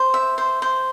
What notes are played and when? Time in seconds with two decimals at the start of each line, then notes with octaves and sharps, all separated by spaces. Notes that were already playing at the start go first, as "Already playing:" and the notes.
Already playing: C5
0.14 E5
0.38 C5
0.62 C5